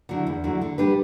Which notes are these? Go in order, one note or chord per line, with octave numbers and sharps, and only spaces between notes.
D3 F#3 A3 E4
E2
D3 F#3 A3 E4
D3
G3 D4 G4 B4